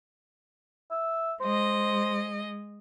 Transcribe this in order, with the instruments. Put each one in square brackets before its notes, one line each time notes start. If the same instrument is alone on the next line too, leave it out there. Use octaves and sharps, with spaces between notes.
[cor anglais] E5
[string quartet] G#3 D#5 [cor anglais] C5